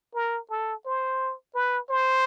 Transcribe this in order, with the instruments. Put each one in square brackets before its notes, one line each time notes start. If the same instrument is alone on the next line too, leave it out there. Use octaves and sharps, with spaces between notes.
[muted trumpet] A#4
A4
C5
B4
C5